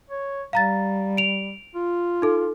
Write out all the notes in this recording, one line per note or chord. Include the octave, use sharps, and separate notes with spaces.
C#5
G3 F5 A#5 A6
D7 F7
F4
D#4 A4